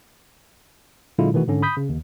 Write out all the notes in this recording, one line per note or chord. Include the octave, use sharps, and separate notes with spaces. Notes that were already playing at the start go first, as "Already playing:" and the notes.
A#2 D3 F#3 G#3 E4 F4
B2 D#3 E3 A3 F#4
G#2 D3 C#4
B5 D#6 G6 B6
C#3
D#2